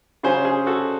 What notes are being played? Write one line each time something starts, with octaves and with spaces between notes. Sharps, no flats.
C#3 F#3 C#4 G#4 C5
G#4 C5
F#4 A4